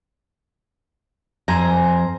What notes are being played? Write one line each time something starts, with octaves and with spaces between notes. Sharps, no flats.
F2 C5 G#5 A#5